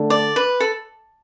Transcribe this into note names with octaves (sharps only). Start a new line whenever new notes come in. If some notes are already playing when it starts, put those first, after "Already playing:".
Already playing: D3 A3 D4 A4
D5
B4
A4